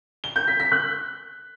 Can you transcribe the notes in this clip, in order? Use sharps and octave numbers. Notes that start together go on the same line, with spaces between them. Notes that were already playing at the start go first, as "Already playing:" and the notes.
G7
G6
B6
B6
F#6